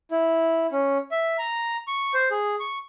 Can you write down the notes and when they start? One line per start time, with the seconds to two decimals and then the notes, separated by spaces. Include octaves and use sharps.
0.11 E4
0.72 C#4
1.11 E5
1.39 A#5
1.87 C#6
2.14 C5
2.31 G#4
2.60 C#6